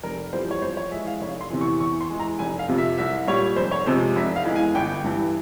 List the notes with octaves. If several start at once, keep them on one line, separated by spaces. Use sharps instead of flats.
F1 A#4
F2 E3 G3 C5
C#5
F2 C5
C#5
E3 G#3 E5
F5
F1 C#5
C6
E2 C3 E3
C#6
E2 C#6
C6
E3 G#3
A#5
F1 G#5
F5
F2 C3 F3
E5
C2 E5
A#2 G3 C#5
F1 C5
C#5
F2 C3 F3 G#3 C5
F1 E5
F5
E2 E3 G#3
G#5
G1 G5
G2 E3